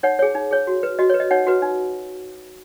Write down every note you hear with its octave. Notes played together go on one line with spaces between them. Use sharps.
D#4 C#5 F#5
G#4 C#5
D#4
G#4 C#5
F#4
B4
F#4 D#5
B4 C#5
D#5
D#4 C#5 F#5
F#4 B4
D#4